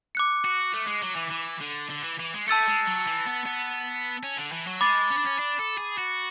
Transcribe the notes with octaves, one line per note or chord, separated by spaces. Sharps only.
D6 F#6 C#7
F#4
A3
G#3
F#3
E3
E3
D3
D3
E3
E3
G#3
A3 A5 E6 A6 C#7
G#3
F#3
E3
B3
B3
C#4
D3
E3
F#3
G#3 B5 D6 A6
C#4
D4
C#4
D4
A4
G#4
F#4